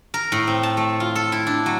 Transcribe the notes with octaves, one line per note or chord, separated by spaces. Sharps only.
A#4
A2
C4
A5
A3
F4
A4
E4
D4
F#3